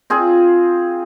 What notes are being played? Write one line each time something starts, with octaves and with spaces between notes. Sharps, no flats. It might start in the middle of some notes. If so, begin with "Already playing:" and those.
C4 F4 G#4